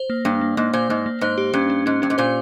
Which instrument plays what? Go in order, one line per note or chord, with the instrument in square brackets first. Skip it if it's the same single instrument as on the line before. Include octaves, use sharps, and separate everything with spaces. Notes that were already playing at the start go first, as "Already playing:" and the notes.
Already playing: [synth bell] C5
A#3
[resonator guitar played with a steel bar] G2 [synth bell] A#3
[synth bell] A#3
[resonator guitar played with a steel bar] G#2 [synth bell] A#3
[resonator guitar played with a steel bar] A#2 [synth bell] C5
[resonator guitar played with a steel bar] G#2 [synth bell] A#3
[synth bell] A#3
[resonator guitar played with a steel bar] G#2 [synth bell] C5
[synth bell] G4
[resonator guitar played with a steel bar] G2 [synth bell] C#4
[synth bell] C#4
[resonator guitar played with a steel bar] G#2 [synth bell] C#4
[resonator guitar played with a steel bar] G2 [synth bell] C#4
[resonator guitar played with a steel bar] G#2
[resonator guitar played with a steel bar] A#2 [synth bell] C5